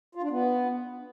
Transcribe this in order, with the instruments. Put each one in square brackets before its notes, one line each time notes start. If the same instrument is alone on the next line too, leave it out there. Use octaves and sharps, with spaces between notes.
[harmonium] F4
D4
B3